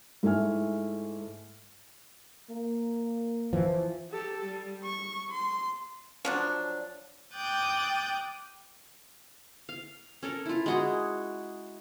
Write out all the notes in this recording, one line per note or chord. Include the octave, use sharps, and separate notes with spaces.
G#2 A3 E4 E5 G#5 F6
A#3
E3 F3
G4 A4
G3
C#6
C6
F3 F#3 D4
G5 D6 D#6 F#6 G6 A6
F5
C#4 A4 A#4
E4 F4
G#3 F#4 G#4